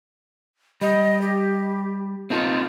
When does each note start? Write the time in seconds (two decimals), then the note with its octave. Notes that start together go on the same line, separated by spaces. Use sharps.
0.81 G3 D#5
1.21 G4
2.30 C4 D#4 F4 A4